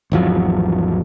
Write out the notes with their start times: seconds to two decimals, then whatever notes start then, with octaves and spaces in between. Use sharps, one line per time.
0.12 G#1 E2 F3 F#3